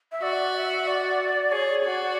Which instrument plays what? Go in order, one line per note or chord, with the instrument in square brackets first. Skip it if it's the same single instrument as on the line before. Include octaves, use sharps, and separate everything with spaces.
[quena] E5
[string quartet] F#4 [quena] D5
[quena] E5
D5
[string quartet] G#4 [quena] C#5
[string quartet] F#4 [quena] D5